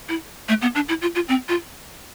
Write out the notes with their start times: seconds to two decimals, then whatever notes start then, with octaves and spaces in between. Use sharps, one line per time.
0.09 E4
0.49 A3
0.62 B3
0.75 D4
0.89 E4
1.02 F4
1.15 F4
1.28 C4
1.49 F4